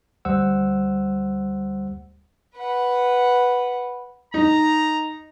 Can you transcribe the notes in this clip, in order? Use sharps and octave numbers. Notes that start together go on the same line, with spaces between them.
D2 G3 C5 F#5 E6
B4 F#5
D#4 A#5